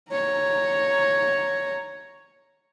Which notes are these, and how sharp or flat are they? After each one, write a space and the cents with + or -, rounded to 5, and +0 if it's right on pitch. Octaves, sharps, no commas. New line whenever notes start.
C#5 +0 A#5 +0